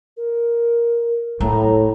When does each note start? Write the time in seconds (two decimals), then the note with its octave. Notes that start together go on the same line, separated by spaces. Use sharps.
0.17 A#4
1.41 A2 A3 A#5